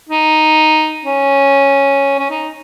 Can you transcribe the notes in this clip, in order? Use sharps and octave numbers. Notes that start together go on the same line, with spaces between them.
D#4
C#4
C#4
D#4